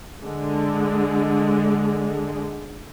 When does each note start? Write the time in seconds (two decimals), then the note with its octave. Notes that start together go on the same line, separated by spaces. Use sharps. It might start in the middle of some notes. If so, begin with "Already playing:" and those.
0.22 D3 G#3